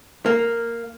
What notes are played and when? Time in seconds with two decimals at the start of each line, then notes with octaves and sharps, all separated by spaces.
0.26 A#3